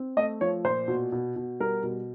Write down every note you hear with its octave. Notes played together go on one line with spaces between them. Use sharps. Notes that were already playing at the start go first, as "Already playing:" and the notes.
Already playing: C4
A3 D#5
F3 C#5
A#2 C5
B2
B2
B2
G3 A#4
B2